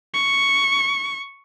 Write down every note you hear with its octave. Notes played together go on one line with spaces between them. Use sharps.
C#6